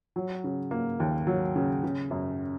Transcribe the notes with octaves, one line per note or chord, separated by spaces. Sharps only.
F#3
C#3
A#3
D#2
F#3
C#3
C#3
F#2